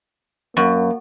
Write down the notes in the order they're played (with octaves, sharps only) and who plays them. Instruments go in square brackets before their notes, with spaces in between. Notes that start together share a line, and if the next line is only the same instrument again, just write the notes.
[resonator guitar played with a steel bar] F#2 [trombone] A#3